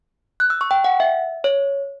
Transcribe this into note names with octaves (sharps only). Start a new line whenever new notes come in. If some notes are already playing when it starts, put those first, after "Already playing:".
F#6
E6
C#6
G5
F#5
E5
C#5